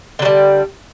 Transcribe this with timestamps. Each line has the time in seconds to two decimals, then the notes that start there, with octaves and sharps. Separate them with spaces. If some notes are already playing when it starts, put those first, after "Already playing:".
0.19 D3
0.22 F#3
0.25 G3